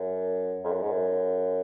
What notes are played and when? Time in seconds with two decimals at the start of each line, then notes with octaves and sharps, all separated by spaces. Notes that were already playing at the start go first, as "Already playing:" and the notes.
Already playing: F#2
0.64 F2
0.72 F#2
0.82 G#2
0.91 F#2